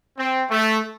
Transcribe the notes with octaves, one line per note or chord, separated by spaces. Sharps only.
C4
A3